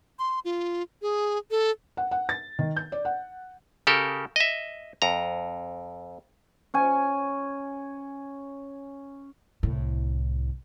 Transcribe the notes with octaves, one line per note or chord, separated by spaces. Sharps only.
C6
F4
G#4
A4
F#5
F#5
A6
D#3
G6
D5
F#5
C#3 G4 A4 A#4
D#5 E5
F2 A#5
C#4 G#5
C2 A2